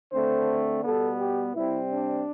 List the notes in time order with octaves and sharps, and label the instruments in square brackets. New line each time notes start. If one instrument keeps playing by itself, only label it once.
[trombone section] D3 A3 C4 C5
B2 G3 B3 A4
G4
C3 G3 C4 E4
D4